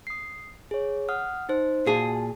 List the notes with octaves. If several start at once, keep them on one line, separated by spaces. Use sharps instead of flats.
D#6 C7
G#4 C#5
F#5 D#6 F6
D#4 C5
A#2 F#4 G#4 A5